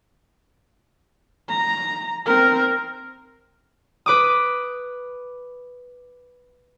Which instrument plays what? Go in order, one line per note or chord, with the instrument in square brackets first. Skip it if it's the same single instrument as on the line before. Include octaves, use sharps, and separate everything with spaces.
[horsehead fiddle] A#5
C4 A#4
[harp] B4 D6 D#6